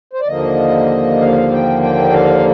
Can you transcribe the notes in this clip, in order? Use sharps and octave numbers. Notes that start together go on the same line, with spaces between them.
C5
D5
D#2 D3 F3 A#3 D#5
F5
G5
G5
F5